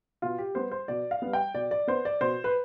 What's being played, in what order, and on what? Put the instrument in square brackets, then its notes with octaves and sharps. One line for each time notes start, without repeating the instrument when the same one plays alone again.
[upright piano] B2 F4
G4
G3 B3 C5
C5
B2 D5
F5
G3 B3
G5
B2 D5
D5
B3 C5
D5
B2 C5
B4